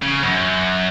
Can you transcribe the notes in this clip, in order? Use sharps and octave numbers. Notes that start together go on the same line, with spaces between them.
C#3
F#2